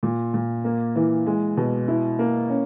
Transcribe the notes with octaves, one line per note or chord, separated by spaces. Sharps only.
A#2
A#2
A#3
E3
G#3
B2
E4
A#3
C#4